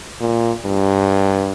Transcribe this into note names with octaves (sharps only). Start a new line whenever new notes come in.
A#2
G2